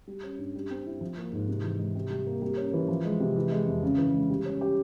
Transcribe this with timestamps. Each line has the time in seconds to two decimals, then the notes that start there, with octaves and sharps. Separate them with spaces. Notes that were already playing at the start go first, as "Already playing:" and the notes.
0.07 G3
0.24 C#4
0.39 G2
0.55 G3
0.71 C4
0.86 E4
1.01 F3
1.17 A#3
1.33 G#2
1.48 C3
1.63 E3
1.79 G#3
1.95 C3
2.10 G3
2.27 A#3
2.42 G3
2.57 C#4
2.73 E3
2.88 F3
3.05 G#3
3.20 C3
3.36 E3
3.51 G#3
3.67 F2
3.83 C#3
3.98 E3
4.14 G#3
4.30 G3
4.45 C#4
4.61 G4